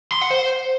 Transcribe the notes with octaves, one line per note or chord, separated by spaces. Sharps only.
C6
F#5
C5